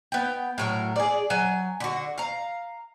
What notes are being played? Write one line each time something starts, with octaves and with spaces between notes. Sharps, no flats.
B3 G5
A2 F#3 A#4
G#4 D5
F#3 G#5
D3 F#4
F5 A#5